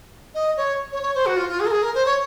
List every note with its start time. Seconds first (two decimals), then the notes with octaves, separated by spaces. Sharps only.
0.35 D#5
0.57 C#5
0.92 C#5
1.03 C#5
1.15 C5
1.26 F#4
1.37 F4
1.49 F4
1.60 G#4
1.66 A#4
1.71 G#4
1.82 A#4
1.95 C5
2.06 C#5